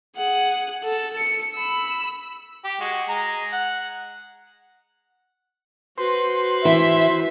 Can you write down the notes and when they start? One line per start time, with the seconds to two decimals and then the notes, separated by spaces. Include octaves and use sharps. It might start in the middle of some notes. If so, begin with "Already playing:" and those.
0.17 G#4 F#5
0.84 A4
1.18 C#7
1.55 B5 E6
2.64 G4
2.81 G#3 F#4
3.09 G#3 A#5
3.53 F#5
5.98 F#4 B4 C5 C6
6.65 E3 E5